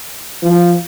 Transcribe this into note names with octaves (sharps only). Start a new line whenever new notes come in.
F3